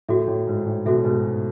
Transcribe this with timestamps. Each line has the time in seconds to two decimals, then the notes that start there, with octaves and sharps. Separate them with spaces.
0.09 A2 F#4 A4 E5
0.27 A2
0.47 G#2
0.66 A2
0.86 B2 F#4 A4 E5
0.95 A2
1.05 G#2 B2